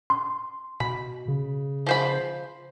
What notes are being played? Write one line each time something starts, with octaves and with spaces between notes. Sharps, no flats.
C6
B2 B5
C#3
F3 C5 B5